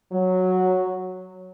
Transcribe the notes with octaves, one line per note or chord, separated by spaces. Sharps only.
F#3